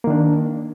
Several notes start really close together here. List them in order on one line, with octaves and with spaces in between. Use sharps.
A#3 D#3 D4